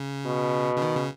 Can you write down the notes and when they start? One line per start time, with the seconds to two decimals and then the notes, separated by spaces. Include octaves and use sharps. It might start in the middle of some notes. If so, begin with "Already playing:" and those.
Already playing: C#3
0.26 B2
0.76 C#3
0.82 D#3
0.96 C#3